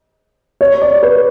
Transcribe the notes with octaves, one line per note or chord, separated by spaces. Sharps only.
C#5
D5
B4